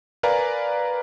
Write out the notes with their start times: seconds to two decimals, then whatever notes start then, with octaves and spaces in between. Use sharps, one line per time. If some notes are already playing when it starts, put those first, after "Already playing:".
0.23 A#4 B4 D5 F5 G#5 A#5